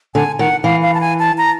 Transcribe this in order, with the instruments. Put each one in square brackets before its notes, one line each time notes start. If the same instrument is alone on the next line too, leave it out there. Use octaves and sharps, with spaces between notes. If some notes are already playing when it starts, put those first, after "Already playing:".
[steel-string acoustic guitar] D3 [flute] G#5
[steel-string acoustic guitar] D#3 [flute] F#5
[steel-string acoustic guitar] E3 [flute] F5
[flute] F5
A5
G#5
A5
A#5